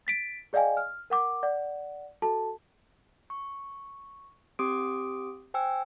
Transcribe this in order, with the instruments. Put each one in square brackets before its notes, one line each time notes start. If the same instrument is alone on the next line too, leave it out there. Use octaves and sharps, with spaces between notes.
[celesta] A6 B6 D7
G#4 D5 D#5 F5 G5 G#5
F6
A#4 F#5 D6
D5 F#5
F#4 A4 A5
[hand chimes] C#6
C4 G4 C6 D6 D#6 D7
C5 G5 G#5 E6